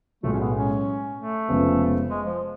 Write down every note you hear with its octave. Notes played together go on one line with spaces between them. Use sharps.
B1 A2 G#3 A3
C#4
B3
C#4
A3
F1 F2 C#3 G#3 B3
G#3
F3